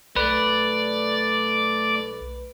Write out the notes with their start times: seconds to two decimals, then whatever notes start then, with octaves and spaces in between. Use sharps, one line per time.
0.16 B1 A3 B4 D5